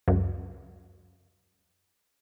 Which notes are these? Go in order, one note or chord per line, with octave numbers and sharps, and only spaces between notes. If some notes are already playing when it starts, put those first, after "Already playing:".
C#2 F#2